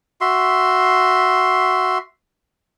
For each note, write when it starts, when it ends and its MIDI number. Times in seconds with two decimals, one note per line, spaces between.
0.21 1.98 66
0.21 1.98 76
0.21 1.98 84